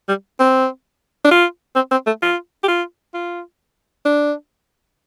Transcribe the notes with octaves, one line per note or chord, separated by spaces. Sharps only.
G3
C4
D4
F4
C4
C4
A3
F4
G4
F4
F4
D4